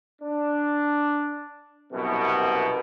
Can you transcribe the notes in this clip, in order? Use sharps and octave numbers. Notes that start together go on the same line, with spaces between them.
D4
C2 F#2 B2